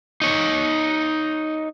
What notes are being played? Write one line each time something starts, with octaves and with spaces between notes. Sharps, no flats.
D#4 C#5